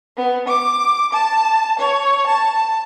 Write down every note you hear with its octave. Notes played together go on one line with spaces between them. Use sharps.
B3
D6
A5
C#5
A5